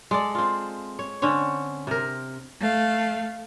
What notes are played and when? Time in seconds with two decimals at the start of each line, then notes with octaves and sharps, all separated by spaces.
0.11 G#3 A4 D5
0.35 C4 F4
0.99 C#5
1.22 D3 C4 C#4 C#5
1.87 C3 A#4
2.61 A3 F5